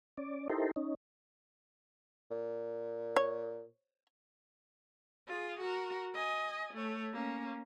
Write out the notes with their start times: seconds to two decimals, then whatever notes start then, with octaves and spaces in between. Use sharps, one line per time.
0.17 C#4 D5
0.50 D#4 E4 G4 A4 A#4 C5
0.76 C#4 D#4
2.31 A#2
3.16 C#5
5.27 F4 G#4
5.60 F#4 A#4
6.14 D#5 G#5
6.73 A3 C#5
7.13 A#3 C#4